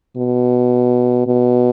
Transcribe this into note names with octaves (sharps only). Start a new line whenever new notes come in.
B2
B2